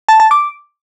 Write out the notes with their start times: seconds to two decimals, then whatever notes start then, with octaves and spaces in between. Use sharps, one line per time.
0.09 A5
0.20 A5
0.31 D6